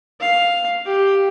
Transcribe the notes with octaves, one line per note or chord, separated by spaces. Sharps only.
F5
G4